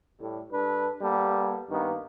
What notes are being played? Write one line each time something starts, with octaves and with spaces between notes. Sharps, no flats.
A2 G3
G2 D4 A4 B4
G3 A#3 B3 A4
G2 D#3 A#3 B3